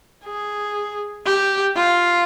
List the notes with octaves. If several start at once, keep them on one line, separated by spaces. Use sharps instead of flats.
G#4
G4
F4